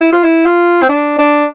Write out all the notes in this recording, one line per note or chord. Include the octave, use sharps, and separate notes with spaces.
E4
F4
E4
F4
C4
D4
D4